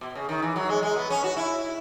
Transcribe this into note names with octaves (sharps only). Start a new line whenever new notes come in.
B2
C#3
D#3
E3
F#3
G#3
G#3
B3
C#4
F#4
E4